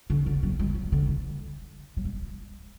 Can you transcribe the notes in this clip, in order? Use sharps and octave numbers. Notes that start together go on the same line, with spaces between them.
D3
D3
F#3
G#3
F#3
D3
E3
F#3
G#3